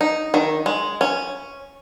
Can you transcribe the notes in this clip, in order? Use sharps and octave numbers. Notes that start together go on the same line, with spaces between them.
D#4
D#3
G#3
C#4